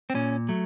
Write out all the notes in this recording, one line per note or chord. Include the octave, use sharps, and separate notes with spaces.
C4
A#2 C#4
F#3 A3